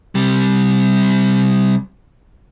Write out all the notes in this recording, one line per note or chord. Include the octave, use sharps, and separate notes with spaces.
C3 G3